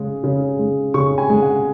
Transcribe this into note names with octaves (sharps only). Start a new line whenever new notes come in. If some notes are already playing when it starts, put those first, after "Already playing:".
Already playing: C#3 G#3
C#3
G#3
C#3 C#6
G#5
G#3
F#5